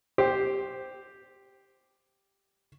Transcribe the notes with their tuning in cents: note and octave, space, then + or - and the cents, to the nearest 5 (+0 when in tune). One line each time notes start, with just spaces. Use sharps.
G4 +0 C5 +0